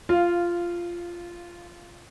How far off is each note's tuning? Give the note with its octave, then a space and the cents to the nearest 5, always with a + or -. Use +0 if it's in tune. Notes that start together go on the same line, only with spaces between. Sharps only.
F4 -10 F5 +0